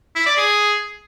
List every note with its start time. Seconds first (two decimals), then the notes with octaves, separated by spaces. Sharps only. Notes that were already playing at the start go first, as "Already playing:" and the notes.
0.16 E4
0.26 D5
0.37 G#4